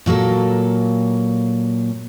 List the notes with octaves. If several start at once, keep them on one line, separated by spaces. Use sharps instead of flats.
A#2 F#3 A#3 A4